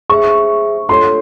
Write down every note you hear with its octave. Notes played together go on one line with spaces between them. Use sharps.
G#4 C5 E5 C#6
F4 A4 C#5 C6